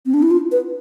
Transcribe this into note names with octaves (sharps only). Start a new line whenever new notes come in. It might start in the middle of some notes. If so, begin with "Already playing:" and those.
C4
D4
E4
F4
B4